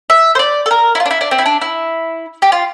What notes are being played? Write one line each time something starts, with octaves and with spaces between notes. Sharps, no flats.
E5
C5
D5
A4
A#4
E4
F4
D4
E4
D4
C4
E4
D4
E4
G4
F4